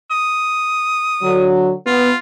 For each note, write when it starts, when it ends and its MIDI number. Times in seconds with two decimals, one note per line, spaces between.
0.11 1.49 87
1.22 1.72 50
1.22 1.72 54
1.87 2.10 59
1.87 2.17 65